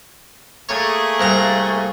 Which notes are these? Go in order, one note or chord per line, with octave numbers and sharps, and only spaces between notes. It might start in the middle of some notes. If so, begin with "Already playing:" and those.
A3 A#3 G#4 C#5
C2 A#2 A#5